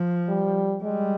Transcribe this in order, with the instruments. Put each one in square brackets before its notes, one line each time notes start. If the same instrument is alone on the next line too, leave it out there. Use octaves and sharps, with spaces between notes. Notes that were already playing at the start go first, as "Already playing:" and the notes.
Already playing: [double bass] F3
[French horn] G3
[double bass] G3 [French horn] G#3